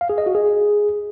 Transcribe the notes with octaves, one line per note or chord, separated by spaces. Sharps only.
F5
G#4
D#5
F#4
G#4